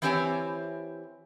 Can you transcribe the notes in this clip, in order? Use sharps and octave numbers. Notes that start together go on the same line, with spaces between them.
E3 C4 E4 G4 C#5 G#5